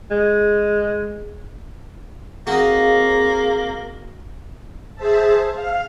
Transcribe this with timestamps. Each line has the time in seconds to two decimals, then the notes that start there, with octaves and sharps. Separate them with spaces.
0.11 G#3
2.47 A#3 C4 D#4 F#4 G#4 F5
4.95 G#4 C5 E5 A5
5.54 F5